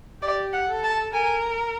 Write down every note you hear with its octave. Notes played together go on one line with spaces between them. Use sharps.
G4 D5
F#5
A4
A5
A#4 G#5